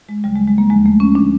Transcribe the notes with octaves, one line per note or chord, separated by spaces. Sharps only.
G#3
D2 C#3 F#3 G3
G#3
G#3
A#3
D#2 D3 F3 G#3
A3
C#4
D3 F3 D4